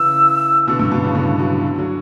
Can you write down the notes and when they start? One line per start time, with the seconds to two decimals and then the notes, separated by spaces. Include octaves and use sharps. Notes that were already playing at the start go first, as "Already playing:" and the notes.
Already playing: C#3 E3 E6
0.67 B2 D3
0.79 G2 B2
0.91 G2 B2
1.03 A2 C#3
1.15 B2 D3
1.39 D3 F#3
1.63 D3 F#3
1.79 D3 F#3